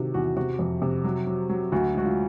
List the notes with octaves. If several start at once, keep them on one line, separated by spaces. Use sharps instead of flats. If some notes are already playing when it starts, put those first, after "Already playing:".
Already playing: C3 D#3 F#4
E2 F#4
C3 F#4
F2
C3
F#3
F#3
F#3
D2 F#4
G#3 F#4
F4